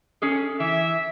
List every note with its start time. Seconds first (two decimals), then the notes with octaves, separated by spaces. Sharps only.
0.22 C#4 G#4 A4
0.60 E3 E5